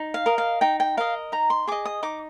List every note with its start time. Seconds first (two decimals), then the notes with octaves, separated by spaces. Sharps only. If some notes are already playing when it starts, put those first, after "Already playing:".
Already playing: D#4
0.14 F5
0.26 A#4 D#5
0.38 F5
0.61 D#4 G5
0.80 G5
0.97 A#4 D#5 F5
1.32 D#4 A#5
1.50 C6
1.67 G#4 D#5 D6
1.85 D#6
2.03 D#4 D6